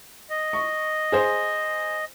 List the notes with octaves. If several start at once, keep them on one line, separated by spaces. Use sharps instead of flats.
D#5
C#6
G#4 C5